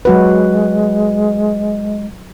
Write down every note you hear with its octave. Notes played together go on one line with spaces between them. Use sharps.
F#3 G#3 F#4 B4